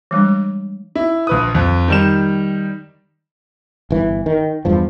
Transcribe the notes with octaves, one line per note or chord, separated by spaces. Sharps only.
E3 G3 G#3 D4
E4
A#1 B4 D#6
F2
D#3 G3 E7
G1 E3
D#3
E2 G2 F3